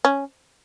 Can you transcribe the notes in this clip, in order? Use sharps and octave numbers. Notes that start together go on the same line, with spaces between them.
C#4